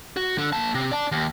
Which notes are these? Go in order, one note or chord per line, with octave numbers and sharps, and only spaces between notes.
F#4
D3
A#3 A5
C3
D5 A5
D#2